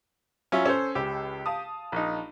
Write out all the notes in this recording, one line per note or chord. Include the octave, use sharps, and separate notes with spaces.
F#3 C#4 F4 E5
C#4 A4 C5
C#2 C#3 G4 E6
F5 A5 D#6
A#1 D#4